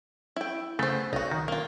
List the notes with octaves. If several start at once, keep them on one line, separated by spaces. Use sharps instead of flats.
E4 G5
C#3 A3 B3 C5
B1 D#4 F#4
D#3
A#3 F4